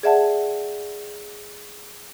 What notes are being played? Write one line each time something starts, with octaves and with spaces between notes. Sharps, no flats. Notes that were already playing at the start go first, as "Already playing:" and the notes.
G#4 D5 E5 F#5 A5